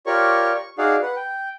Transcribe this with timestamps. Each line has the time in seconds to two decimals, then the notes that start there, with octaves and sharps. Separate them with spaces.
0.06 F4 G4 A#4 C#5 D5 C#6
0.56 C#6
0.78 D#4 F#4 G#4 D5 F5 F#5
1.02 B4 F#5
1.16 G5